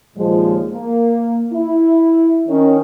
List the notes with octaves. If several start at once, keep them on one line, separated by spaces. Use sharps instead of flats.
D#2 A#2 F3 G#3
A#3
E4
D#3 C#4